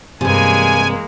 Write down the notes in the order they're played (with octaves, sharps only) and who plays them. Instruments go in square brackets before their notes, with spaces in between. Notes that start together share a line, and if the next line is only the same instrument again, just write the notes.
[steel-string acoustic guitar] G2 C3 [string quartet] E3 G#3 A#3 [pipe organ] G#5